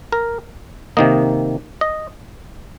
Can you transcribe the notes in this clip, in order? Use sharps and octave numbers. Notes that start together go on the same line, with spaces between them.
A#4
C3 D#3 A#3 D#5
D#5